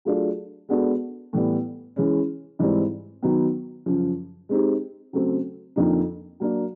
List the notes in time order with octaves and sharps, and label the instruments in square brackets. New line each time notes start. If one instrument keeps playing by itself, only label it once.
[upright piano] F#3 A3 D4 F4 G#4
G#3 B3 D4 F#4 A4
A2 E3 G3 B3
E3 G#3 C#4
G#2 E3 G3 C4
D#3 F#3 B3
F#2 C#3 F3
G#3 C4 D#4 G4
C#3 F#3 A3 C4
F2 D3 F3 A#3 D#4
F#3 A#3 D4